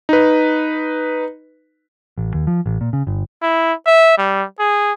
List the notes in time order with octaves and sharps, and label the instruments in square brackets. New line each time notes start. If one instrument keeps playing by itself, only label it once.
[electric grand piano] D#4 B4
[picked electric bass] A1
D#2
F3
A1
A#2
C#3
G1
[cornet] E4
E5
G3
G#4